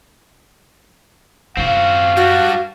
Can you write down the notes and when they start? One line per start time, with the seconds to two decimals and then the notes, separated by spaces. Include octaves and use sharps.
1.57 F#2 C4 F4 F#4 F5
2.17 G3 D4 F#4